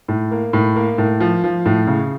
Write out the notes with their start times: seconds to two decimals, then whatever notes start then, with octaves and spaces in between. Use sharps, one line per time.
0.08 A2
0.31 A#3
0.53 A2
0.76 A#3
0.98 A2
1.20 F3
1.44 F3
1.66 A2
1.87 C#3